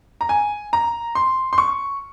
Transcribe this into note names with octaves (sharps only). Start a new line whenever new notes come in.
A#5
G#5
A#5
C6
C6
C#6